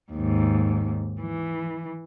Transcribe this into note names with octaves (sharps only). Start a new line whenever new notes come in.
D#2 G#2
E3